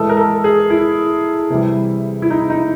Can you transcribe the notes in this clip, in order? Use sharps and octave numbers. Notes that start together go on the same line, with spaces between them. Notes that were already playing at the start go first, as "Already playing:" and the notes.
Already playing: A2 E3 G#3 A4
A#4
A4
G#4
E4
C3 E3 G3
E4
D#4
D#4